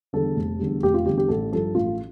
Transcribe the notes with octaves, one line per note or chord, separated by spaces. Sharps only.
E2 D3 G3 A4
F1
E2 D3 G3
F1 G4
F4
E2 D3 G3 G4
G4
A1 A4
G2 F3 A4
A1 F4